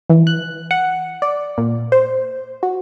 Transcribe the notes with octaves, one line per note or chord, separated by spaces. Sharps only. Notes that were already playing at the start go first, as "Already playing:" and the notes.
E3
F#6
F#5
D5
A#2
C5
F#4